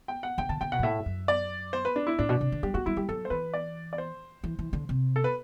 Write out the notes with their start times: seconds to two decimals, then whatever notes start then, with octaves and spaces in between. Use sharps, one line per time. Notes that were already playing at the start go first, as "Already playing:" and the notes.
0.08 G5
0.23 F#5
0.38 D3 G5
0.49 D3 A5
0.61 D3 G5
0.72 B2 F#5
0.79 G2
0.83 A2 E5
1.06 F#2
1.28 D5
1.73 C5
1.85 B4
1.96 D4
2.07 E4
2.19 A2 D4
2.29 B2
2.41 C3
2.52 D3
2.63 G3 G4
2.74 A3 F#4
2.86 G3 E4
2.96 G3 G4
3.09 F#3 A4
3.25 C5
3.30 E3 B4
3.54 D5
3.93 D5
3.98 C5
4.44 E3
4.59 E3
4.73 D3
4.89 C3
5.16 A4
5.24 B4